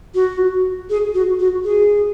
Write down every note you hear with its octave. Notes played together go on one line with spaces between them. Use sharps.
F#4
G#4
F#4
F#4
G#4